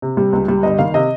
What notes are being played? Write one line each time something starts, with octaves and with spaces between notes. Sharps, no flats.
C3
G3
C#2
G3
G1 D#5
D#3 F5
C3 D#5